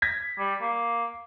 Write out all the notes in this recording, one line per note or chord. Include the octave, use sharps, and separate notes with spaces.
G#6 A#6 B6
G3
A#3